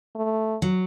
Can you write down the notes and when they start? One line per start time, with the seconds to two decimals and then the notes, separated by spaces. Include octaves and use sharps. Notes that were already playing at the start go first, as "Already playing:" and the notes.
0.15 A3
0.62 F#3